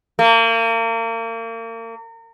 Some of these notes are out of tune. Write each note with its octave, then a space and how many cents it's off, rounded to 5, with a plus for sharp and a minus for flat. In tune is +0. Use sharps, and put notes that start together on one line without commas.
A#3 -35